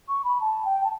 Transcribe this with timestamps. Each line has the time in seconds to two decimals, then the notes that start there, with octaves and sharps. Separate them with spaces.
0.08 C#6
0.24 B5
0.41 A5
0.65 G5
0.84 A5